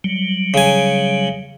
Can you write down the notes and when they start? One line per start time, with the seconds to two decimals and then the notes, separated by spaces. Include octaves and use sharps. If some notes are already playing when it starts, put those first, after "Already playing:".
0.04 F#3 G3
0.54 C#3 G#5